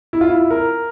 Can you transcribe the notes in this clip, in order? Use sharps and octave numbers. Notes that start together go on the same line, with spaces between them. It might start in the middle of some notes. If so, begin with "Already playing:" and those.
E4
F4
E4
A#4